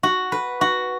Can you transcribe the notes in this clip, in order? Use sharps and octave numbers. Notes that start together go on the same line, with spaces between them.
F#4
B4
F#4